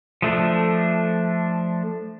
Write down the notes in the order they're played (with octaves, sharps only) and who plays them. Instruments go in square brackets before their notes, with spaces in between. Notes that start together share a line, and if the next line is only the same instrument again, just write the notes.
[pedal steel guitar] F3 A3 D4